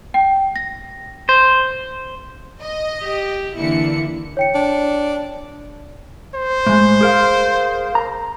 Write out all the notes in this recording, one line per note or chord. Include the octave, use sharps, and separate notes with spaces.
G5
A#6
C5
D#5
G4
D3 E3 A#3 E4 C#7
C#5 G5 C#7
D4
C5
A2 G#3
G#4 A#4 F5
A#5